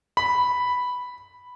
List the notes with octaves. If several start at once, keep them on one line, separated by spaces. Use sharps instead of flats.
B5